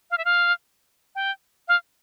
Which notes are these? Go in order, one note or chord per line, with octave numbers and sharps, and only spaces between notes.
F5
E5
F5
G5
F5